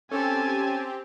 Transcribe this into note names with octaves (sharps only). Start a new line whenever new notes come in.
C4 C#4 G4 A4 G#5 A5